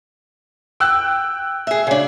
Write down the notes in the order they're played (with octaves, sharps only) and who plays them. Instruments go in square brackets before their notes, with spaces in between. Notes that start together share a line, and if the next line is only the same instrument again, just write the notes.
[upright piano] G5 E6 F#6
[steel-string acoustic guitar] G#4 E5
C#3 D4